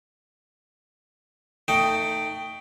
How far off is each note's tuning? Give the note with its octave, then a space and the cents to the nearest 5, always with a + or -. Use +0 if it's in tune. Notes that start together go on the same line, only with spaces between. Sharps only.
A3 +25 D#4 +0 G5 +0